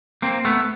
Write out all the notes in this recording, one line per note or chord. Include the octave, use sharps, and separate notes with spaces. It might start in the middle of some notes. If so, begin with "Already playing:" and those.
A#3 C4
A3 B3